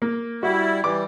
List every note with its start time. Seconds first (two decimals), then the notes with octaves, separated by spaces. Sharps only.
0.02 A#3
0.43 G3 E4 F#4
0.84 E3 G3 D6